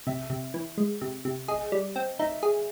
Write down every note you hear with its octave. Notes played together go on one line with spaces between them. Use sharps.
C3 E5
C3
E3
G#3
C3
C3
G#4 D#5
G3
C4
D#4 E5
G#4